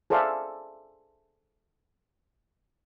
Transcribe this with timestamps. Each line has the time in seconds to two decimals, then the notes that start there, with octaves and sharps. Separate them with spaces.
0.10 G#4 A4 C5 D5 E5 F5